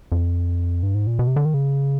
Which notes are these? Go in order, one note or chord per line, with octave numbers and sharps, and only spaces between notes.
F2
G2
G#2
A#2
B2
C3
D3
D#3
C#3